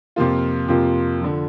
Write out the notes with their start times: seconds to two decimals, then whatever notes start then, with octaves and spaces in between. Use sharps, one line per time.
0.16 F2 C3 F3 A#3 F4
0.68 F2 C3 F3 A#3 F4
1.22 D3 F3